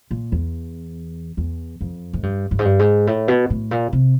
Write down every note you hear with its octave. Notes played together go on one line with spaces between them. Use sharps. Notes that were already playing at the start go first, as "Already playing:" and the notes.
A#2
E2
E2
F2
G#2
G2
G2
G#2
G2
G#2
A2
B2
A2
A#2
C3